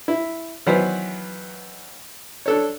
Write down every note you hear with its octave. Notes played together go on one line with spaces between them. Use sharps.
E4
D#3 E3 F#3 B3 B4 C5
D4 A4 C#5